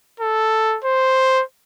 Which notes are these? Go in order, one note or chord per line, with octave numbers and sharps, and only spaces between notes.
A4
C5